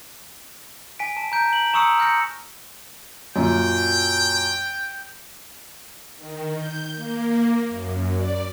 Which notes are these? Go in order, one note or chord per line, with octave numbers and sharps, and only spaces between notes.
G#5 B6 D7
A5
A#5 G6 D7
F#7
A#5 C#6 D#6 E6 C#7 E7
F6 G6 A#6 C#7
F#2 A#2 G5
D#3
G6
A#3
F#2
D5